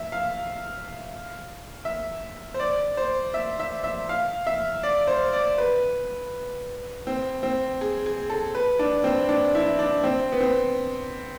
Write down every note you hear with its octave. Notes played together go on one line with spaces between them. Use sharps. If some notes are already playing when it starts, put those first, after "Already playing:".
Already playing: E5
F5
E5
C5
D5
C5
E5
E5
E5
F5
E5
D5
C5
D5
B4
C4
C4
G#4
G#4
A4
B4
D4
C4
D4
E4
D4
C4
B3
C4